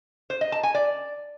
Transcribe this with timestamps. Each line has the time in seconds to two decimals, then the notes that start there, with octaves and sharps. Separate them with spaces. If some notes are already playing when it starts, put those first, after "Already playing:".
0.30 C5
0.41 D#5
0.52 A5
0.63 G#5
0.75 D5